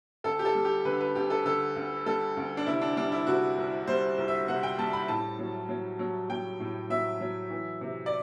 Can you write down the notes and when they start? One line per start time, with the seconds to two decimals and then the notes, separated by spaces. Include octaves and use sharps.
0.24 D2 A4
0.39 G4
0.45 A4
0.55 G3
0.65 G4
0.85 D3 B4
1.00 B4
1.15 D2 G4
1.30 A4
1.45 D3 A4
1.76 D2
2.06 G3 A4
2.37 D2
2.57 D4
2.66 C3 E4
2.81 D4
2.97 G3 D4
3.12 E4
3.27 C3 F#4
3.58 C2
3.87 G3 C5
4.18 C2
4.28 E5
4.48 C3 F#5
4.63 G5
4.78 G3 A5
4.93 B5
5.08 A2 A5
5.39 F#3
5.69 F#3
5.99 F#3
6.30 F#3 G5
6.60 A2
6.90 F#3 E5
7.21 F#3
7.50 E3
7.81 C3
8.06 D5